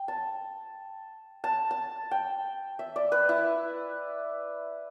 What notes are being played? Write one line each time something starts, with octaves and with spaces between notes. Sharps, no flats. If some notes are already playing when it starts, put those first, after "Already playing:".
Already playing: G5
A5
A5
A5
G5
E5
D5
B4
E4